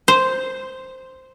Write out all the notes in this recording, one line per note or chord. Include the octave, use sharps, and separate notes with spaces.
C5